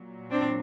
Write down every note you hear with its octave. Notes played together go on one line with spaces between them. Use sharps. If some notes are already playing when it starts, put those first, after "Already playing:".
Already playing: A#2 F#3
C4 D4